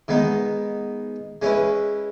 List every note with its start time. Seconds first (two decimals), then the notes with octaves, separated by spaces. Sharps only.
0.08 D#3 G#3 B3 D#4
1.42 G#3 C#4 E4 B4